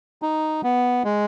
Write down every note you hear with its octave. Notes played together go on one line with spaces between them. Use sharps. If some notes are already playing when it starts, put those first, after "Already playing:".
D#4
B3
G#3